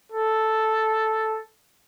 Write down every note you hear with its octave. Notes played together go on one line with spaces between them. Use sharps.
A4